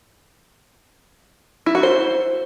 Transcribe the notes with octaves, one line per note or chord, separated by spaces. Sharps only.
E4
F#4
C5